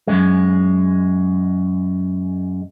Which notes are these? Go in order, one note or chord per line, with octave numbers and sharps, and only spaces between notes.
F#2 G#3